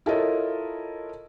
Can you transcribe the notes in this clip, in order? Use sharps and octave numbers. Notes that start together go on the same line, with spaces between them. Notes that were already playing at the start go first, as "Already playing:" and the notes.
E4 F4 A4 A#4 C#5 D#5